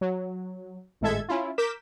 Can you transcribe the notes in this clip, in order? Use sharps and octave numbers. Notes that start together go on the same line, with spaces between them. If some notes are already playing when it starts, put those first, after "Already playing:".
F#3
G#1 A2 G#3 A4 E5 G#6
C#4 E4 F4
A#4 D6 G6 B6 E7